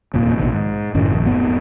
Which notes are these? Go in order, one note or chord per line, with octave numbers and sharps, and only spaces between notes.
F1 D#2 A#2
A#1 B2 D#3
G#2
F#1 F#2 A2 D#3
A#1
F1 G#2 B3